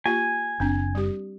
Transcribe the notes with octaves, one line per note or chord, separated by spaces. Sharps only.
A#3 F4 G4 G#5
F#1 C4 D4
G3 G4